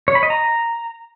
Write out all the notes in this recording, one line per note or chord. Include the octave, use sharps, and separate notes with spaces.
C#5
B5
D#5
A#5